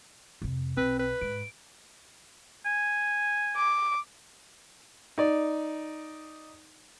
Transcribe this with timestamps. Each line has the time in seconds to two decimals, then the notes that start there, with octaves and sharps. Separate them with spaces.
0.42 F2 C3
0.77 B1 C4 B4
0.99 B4
1.21 G#2 D7
2.66 G#5
3.56 D6
5.18 D#4 D5